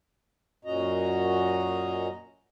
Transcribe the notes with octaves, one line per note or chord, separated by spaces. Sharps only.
F#2 A#2 C#4 F#4 D#5 A#5